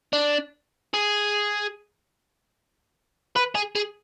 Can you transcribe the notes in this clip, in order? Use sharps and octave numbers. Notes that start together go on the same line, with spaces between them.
D4
G#4
B4
G#4
G#4